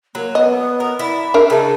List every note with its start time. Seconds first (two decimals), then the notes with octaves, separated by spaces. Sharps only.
0.15 F#3 A#3
0.35 B3 D#5
0.80 A#4
0.99 E4 D5
1.34 D4 G#4 A#4 E5
1.50 C#3 D#4 A5